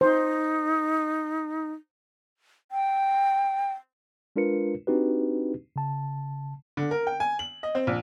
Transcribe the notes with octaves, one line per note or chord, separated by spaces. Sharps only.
D#4 C5
G5
G#3 D4 F4 A#4 B4 C#7
C4 D4 D#4 F#4 G4 B4
C#3 A5
D3
A#4
G5
G#5
F#7
D#5
C4
A#1